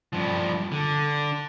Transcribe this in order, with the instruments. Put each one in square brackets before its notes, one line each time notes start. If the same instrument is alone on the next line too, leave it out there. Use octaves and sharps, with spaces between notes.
[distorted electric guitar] G2 F3
D3